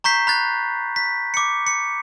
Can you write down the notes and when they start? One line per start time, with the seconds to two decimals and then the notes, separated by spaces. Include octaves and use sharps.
0.04 A#5 C#6 G6 B6 C7
0.27 B5 F#6 A6
0.96 B6
1.34 D6 C#7
1.67 C#7